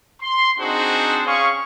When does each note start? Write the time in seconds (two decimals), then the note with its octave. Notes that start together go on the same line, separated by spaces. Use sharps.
0.22 C6
0.59 C4 D4 D#4 F#4 G#4 C5
1.26 C#4 G#4 F5 C#6